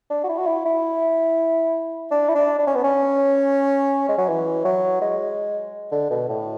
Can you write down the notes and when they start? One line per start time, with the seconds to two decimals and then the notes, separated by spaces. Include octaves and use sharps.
0.10 D4
0.24 F#4
0.29 E4
0.38 F#4
0.47 E4
0.65 E4
2.11 D4
2.29 E4
2.35 D4
2.58 D4
2.67 C#4
2.75 B3
2.84 C#4
4.08 G#3
4.18 F#3
4.28 E3
4.65 F#3
5.01 G#3
5.91 D3
6.10 B2
6.29 A2